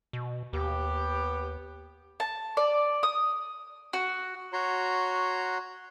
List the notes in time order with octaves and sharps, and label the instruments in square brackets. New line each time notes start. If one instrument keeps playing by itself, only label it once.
[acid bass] B2
[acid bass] D#2 [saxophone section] B3 G4
[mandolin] A5
D5
D#6
F#4
[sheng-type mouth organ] F#4 C#5 A#5 C6